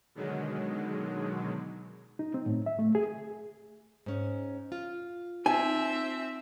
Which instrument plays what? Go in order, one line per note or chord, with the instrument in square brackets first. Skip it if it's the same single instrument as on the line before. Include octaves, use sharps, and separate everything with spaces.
[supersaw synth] B2 D3 D#3 F#3 G#3
[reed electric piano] D#4
C4
A2
E5
A3
G#4
[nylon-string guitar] G#2 C#4
F4
[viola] C4 E5 [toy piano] D#4 [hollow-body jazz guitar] G#5